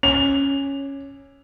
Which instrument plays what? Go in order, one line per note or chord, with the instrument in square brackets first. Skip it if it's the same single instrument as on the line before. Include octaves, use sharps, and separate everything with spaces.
[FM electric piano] C#4 [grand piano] F7